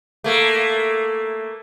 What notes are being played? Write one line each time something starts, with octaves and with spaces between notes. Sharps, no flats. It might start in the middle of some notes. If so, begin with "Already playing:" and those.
A3 A#3